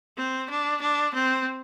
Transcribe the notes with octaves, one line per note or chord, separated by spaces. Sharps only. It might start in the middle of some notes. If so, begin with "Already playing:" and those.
C4
D4
D4
C4